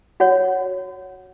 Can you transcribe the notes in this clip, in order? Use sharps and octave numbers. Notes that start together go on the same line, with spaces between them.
F#4 C#5 F#5